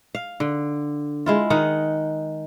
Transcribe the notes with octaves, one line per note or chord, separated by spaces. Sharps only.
F5
D3
G#3 E4 F4
D#3 D#4 F#5